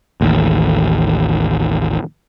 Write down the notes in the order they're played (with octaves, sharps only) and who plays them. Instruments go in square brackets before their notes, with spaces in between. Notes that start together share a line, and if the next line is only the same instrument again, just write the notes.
[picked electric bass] A1 D#2